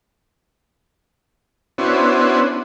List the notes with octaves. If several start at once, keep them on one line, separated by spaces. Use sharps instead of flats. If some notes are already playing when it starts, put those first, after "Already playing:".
B3 C#4 D4 E4 F#4 C5